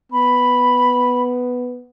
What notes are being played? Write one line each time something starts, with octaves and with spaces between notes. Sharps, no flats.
B3 B5